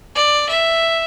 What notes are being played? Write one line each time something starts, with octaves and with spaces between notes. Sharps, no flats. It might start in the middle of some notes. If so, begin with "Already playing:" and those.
D5
E5